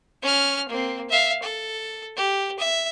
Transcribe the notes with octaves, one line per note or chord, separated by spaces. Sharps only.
C#4 F6
A#3 C4
E5 F5
A4
G4
E5